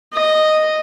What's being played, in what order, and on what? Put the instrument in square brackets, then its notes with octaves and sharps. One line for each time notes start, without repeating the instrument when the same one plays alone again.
[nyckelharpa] D#5